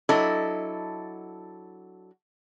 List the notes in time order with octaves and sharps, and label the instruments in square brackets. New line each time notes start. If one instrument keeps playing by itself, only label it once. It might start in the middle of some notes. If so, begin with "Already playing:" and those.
[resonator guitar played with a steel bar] F#3 D4 E4 A4 D#5